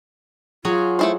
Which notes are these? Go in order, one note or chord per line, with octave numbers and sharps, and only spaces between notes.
F#3 F4 G#4 C#5
A3 E4 C5